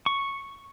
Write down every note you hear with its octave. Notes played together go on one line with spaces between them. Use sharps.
C#6